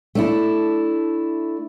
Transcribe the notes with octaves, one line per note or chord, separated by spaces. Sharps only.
A3 D4 E4